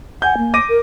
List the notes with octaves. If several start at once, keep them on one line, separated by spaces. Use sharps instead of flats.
F#5 G#5 G6
A#3
D6 A#6 D#7
A#4